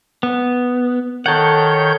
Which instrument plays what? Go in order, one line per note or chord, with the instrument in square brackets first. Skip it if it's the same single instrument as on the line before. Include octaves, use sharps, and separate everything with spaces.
[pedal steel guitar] B3
[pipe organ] D#3 C#5 G6 [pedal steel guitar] A4 F#5